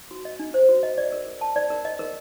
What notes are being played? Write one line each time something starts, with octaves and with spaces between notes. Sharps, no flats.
F#4
D#5
D4
C5
F#4
D#5
D5
A#4
A#4
A5
D5
A#4
D#5
A#4